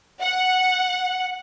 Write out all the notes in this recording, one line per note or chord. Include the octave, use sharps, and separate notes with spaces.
F#5